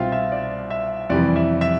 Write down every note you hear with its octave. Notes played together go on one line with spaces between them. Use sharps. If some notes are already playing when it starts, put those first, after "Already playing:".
Already playing: C2 B2 G3 C4 F4 E5 F5 G5
E5
D5
E5
F2 C3 E3 G3 D5
E5
E5